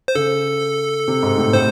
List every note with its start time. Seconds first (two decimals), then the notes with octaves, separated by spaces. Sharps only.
0.08 C5
0.15 C#3 A4
1.08 C3
1.23 G#2
1.38 A2
1.53 A2 C5